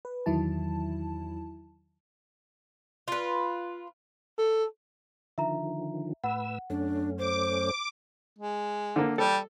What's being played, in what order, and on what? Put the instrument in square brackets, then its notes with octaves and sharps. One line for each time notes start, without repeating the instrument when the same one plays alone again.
[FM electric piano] B4
E2 D#3 F#3 E4 A5
[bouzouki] F4 B4
[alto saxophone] A4
[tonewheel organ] D3 D#3 F3 [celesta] E5 A#5
[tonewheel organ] A2 B4 E6 [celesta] F#5
[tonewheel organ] F#2 A3 C#4 [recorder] D4
[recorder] C5 [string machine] D6
[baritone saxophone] G#3
[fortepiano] D3 A#3
[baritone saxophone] G3 [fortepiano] A4